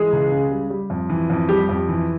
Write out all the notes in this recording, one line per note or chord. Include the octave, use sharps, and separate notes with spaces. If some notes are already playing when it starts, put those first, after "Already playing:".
Already playing: E3 G#3 G#4
C#2
C#3
G3
G3
F2
E3
F2
G3 G4
F2
E3